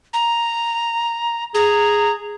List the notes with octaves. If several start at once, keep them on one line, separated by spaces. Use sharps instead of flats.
A#5
G#4 A#5